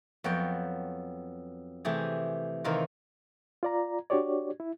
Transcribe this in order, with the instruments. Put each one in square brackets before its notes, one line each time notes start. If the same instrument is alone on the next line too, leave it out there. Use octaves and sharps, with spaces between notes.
[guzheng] F2 F#3 B3 C#5 G5
C3 E3 A3 G4 G#4
C3 D#3 E3 D#4 F4
[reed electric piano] F4 D5 A#5
D4 F#4 G4 C#5 D5
E4